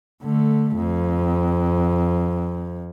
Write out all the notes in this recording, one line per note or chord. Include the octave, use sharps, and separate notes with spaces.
D3 A3
F2